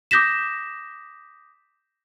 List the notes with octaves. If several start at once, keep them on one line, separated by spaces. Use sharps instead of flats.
D6 D#6 G6 A#6 B6 E7